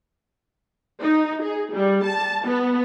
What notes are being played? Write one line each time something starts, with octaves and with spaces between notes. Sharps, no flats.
D#4
G#4
G3
A5
B3